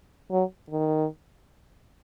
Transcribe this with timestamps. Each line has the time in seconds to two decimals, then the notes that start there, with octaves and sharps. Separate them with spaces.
0.31 F#3
0.70 D#3